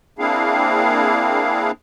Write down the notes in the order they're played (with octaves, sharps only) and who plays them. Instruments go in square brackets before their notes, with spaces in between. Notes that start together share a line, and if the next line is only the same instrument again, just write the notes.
[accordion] A#3 C4 D4 E4 G#4 F5